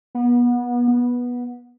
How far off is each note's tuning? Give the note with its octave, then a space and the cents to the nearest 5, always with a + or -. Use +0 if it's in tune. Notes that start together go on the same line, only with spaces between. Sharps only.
B3 -30
B3 -15